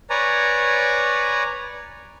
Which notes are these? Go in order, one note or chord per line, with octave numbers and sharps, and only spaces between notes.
B4 C#5 D5 G#5 A#5